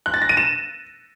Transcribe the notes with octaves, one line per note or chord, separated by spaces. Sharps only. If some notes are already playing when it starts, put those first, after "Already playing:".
F#6
A6
A#6
D#7
E7